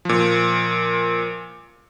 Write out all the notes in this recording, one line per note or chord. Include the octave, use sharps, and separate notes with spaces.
A#2 F3